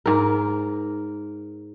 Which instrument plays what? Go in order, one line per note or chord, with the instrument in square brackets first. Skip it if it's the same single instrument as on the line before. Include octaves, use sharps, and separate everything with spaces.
[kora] G#2 A#4